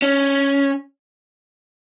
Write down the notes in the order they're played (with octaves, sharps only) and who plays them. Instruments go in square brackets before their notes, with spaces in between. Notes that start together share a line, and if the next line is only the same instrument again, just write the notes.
[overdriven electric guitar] C#4